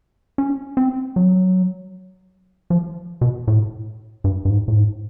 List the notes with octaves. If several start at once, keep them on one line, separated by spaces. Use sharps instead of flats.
C#4
C4
F#3
F3
B2
A2
G2
G2
G#2
A2
G#2